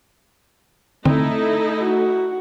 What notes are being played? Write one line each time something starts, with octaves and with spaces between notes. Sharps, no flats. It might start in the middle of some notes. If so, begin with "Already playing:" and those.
D3 A3 C4 D#4 E4 A4
F#4